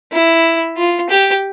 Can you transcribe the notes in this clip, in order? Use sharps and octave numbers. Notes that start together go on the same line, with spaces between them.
E4
F4
G4